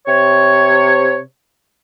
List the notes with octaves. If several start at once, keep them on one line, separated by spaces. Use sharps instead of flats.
C3 C#5